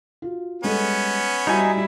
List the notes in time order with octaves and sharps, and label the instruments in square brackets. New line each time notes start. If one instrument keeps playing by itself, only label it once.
[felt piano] F4 F#4
[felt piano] G3 G#3 A4 [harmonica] B3 C#4
[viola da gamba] G3 E4 [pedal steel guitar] D#4 G#5 [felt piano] F#4 D#5